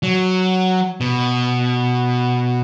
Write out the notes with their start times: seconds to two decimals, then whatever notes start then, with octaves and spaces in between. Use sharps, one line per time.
0.03 F#3
1.01 B2